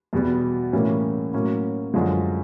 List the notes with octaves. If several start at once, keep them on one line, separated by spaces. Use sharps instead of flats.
E2 B2 G3 B3
A2 E3 G3 A#3 C#4
A2 F#3 A#3 C#4
F#2 D3 F3 G#3